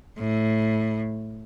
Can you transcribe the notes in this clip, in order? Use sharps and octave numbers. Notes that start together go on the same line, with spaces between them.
A2